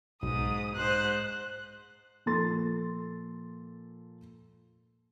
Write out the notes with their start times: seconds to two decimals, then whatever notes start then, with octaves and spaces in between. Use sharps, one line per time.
0.23 B1 G#2 D#6
0.75 G#2 C5 F#6
2.26 A#2 F3 A4 C6 A6